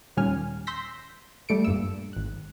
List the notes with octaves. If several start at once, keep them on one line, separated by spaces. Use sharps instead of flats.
D#2 A#2 G3 C#4 G#5 F6
C6 E6 G6 A#6 B6
G3 A3 A4 C#7 D7
G2 A#2 E6
G#1 F#6